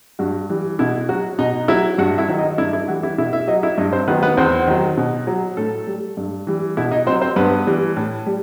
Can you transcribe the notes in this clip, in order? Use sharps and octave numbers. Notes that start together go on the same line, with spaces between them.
G2 F#4
E3 G3
B2 E4
F#3 F#4
B2 D#4 D#5
F#3 E4 E5
G2 F#4 F#5
E4 E5
D#3 F#3
D#4 D#5
G2 E4 E5
E4 E5
E3 G3 F#4 F#5
E4 E5
B2 E4 E5
E4 E5
F#3 D#4 D#5
E4 E5
G2 D#4 D#5
C4 C5
D#3 F#3 B3 B4
B3 B4
E2 C4 C5
D#3 F#3
B2
F#3
A2 A3 A4
G3
G2
E3 G3
B2 E4 E5
D#4 D#5
F#3 C4 C5
C4 C5
G2 B3 B4
E3 G3
A2
G3